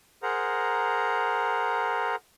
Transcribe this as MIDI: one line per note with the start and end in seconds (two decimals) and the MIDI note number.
0.23 2.16 68
0.23 2.16 70
0.23 2.16 72
0.23 2.16 78
0.23 2.16 82